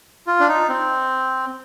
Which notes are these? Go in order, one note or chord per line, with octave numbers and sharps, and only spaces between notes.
F4
D4
D#4
C4